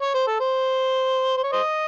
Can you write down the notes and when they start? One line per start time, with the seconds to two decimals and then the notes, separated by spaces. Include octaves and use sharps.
0.02 C#5
0.14 C5
0.27 A4
0.40 C5
1.37 C5
1.44 C#5
1.52 C5 D#5